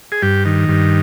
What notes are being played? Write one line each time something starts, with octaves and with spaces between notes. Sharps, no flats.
G#4
G2 G4
D#3
G2